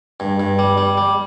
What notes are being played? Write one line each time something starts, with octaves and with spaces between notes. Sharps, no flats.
G2
G2
G3
G3
G3